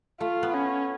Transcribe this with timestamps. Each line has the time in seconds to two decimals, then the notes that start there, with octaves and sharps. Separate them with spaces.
0.20 A3 F4
0.43 B3
0.54 C#4